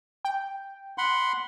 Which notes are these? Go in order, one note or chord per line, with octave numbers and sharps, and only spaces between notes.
G5
F#5 B5 C6